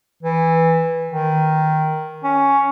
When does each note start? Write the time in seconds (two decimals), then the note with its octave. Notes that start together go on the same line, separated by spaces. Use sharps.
0.23 E3
1.11 D#3
2.23 C#4